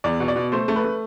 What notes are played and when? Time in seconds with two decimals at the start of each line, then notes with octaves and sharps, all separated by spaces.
0.04 E2 D5
0.20 B2
0.28 D5
0.36 B2
0.52 A3 C5
0.68 A3
0.76 B4
0.84 A3